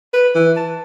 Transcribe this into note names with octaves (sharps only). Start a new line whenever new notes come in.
B4
E3
A5